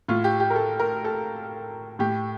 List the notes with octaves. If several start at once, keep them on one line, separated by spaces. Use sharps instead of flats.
A2 F4
G4
G4
A#4
A4
A#4
A4
A2 G4